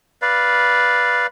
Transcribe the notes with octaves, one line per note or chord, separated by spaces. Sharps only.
B4 D5 F5